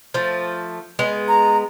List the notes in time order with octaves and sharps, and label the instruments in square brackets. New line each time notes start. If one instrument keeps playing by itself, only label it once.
[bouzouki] F3 A3
G#3 B3
[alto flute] A#5